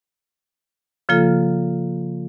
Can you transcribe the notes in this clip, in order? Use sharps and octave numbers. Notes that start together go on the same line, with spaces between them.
C#3 F3 A#3 F4 A4